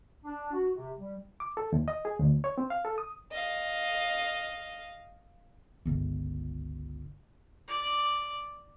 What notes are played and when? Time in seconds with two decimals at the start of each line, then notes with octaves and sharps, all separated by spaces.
0.24 D4
0.53 F#4
0.76 C3
0.99 G3
1.40 D6
1.57 A4
1.72 D#2
1.88 D#5
2.05 G#4
2.19 D2
2.44 C#5
2.58 C4
2.70 F5
2.85 A4
2.98 D#6
3.32 D#5 F5
5.85 G1 C#2
7.68 D5